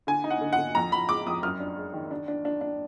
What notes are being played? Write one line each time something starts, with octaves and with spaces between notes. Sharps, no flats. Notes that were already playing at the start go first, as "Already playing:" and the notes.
D3 G#5
D#4
F#5
D3
F#5
D3
F2 A#5
F2 B5
G#3 D6
F2 D#6
F#2 F6
D4
G#3
D#3
D4
D4
D4
D4